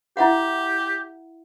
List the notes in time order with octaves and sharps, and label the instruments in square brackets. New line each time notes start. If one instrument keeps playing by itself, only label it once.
[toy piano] E4 E5 F#5 [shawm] G4